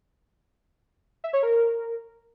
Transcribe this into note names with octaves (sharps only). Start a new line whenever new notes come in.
E5
C#5
A#4